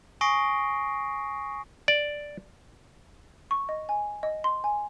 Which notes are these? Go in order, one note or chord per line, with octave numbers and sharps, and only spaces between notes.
G#5 C#6 D#6 A#6 C7 D7
D5
C#6
D#5
G#5
D#5
C6
G#5